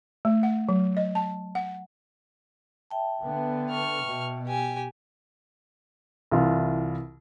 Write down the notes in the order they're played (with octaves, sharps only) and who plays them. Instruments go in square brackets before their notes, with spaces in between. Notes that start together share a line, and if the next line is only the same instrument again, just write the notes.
[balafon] A3
F#5
F#3
D#5
A5
F#5
[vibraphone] E5 G5 A5
[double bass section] D3 B3
[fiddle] C#6 F6
[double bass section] B2
[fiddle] G4 G#5 [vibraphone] G5
[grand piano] C2 E3 F4